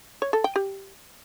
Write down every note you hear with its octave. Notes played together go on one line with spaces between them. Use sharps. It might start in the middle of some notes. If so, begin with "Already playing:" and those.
C#5
A4
G5
G4